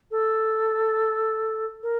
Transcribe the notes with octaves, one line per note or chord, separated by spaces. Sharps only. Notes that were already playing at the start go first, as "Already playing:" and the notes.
A4
A#4